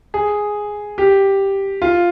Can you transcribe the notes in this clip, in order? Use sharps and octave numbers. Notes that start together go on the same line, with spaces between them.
G#4
G4
F4